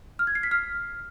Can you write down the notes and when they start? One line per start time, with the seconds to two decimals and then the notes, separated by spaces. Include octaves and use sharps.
0.19 F6
0.27 G#6
0.35 C7
0.43 B6
0.51 F6